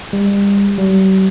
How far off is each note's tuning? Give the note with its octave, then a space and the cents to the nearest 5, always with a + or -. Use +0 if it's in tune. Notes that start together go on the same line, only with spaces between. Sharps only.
G3 +35
G3 -45